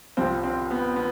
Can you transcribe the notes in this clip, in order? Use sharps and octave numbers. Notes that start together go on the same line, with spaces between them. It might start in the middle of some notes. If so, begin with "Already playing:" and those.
C2 C3 F3 C4
C4
B3
B3